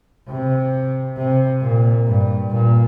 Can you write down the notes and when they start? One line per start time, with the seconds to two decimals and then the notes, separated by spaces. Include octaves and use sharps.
0.28 C3
1.17 C3
1.61 A#2
2.07 G2
2.51 A#2